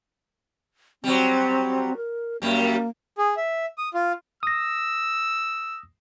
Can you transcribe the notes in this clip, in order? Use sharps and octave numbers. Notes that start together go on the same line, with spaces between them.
F#3 G3 C4
A#4
F#2 G3 A#3
G#4
E5
D#6
F4
D#6 E6 A#6